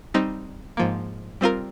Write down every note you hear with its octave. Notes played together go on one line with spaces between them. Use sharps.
G3 C4 D#4
G#2 F3 A#3
G3 C4 F4 A#4